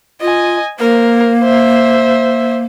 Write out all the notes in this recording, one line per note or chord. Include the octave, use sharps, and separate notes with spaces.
F4 D#5 G#5
A#3 A#4 C5
C5 E5